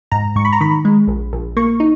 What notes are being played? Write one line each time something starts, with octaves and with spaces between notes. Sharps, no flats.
G#2 A#5
G#2 C#6
B5
A#5
D#3 B5
G#3
A#1
A#1
A#3 C#6
D#4